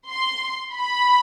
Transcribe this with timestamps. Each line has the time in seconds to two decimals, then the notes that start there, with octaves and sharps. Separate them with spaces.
0.09 C6
0.74 B5